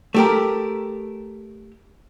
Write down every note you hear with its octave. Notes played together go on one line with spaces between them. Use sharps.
A3 G4 A#4